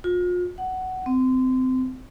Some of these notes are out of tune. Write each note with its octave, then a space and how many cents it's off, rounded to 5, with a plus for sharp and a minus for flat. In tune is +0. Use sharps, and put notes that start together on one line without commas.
F4 +40
F#5 +15
C4 -25